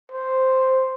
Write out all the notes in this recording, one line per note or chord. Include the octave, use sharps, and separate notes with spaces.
C5